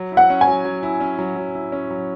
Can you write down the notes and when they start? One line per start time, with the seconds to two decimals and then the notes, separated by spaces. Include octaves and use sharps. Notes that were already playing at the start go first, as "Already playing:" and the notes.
Already playing: F#3
0.12 E4
0.17 F#5
0.30 C#4
0.41 G#5
0.47 F#3
0.65 F#3
0.83 E4
1.01 C#4
1.19 F#3
1.36 F#3
1.55 E4
1.72 C#4
1.91 F#3